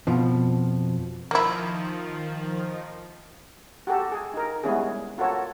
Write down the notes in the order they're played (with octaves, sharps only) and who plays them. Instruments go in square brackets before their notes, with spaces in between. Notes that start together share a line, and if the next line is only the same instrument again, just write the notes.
[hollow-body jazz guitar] F2 B2 F3
[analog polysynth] D#3 F3 [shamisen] A#3 E4
[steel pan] F#4 G4 A4
G#4
D#4 A#4
G3 G#3 B3 C#4 E4 G#4
F4 F#4 A4 A#4 C#5